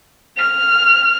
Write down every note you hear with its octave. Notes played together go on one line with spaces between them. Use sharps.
F6